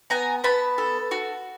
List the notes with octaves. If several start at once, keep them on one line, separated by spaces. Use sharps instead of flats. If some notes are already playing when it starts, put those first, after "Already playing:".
B3 G#5 A#5
B3 A5 B5
A4
F#4